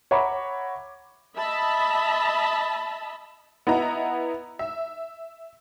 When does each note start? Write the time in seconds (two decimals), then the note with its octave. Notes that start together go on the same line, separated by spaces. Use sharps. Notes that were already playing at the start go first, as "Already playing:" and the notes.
0.11 C#5 E5 F#5 A#5 B5 D6
1.37 D#5 E5 A5 B5
3.67 B3 E4 D#5 A#5
4.59 E5